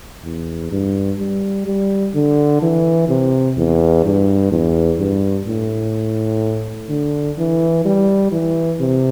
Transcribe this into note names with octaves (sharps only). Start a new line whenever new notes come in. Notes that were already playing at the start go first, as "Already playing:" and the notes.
E2
G2
G3
G3
D3
E3
C3
E2
G2
E2
G2
A2
D3
E3
G3
E3
C3